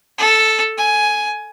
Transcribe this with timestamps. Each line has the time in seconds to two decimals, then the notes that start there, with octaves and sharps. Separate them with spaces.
0.18 A4
0.78 G#5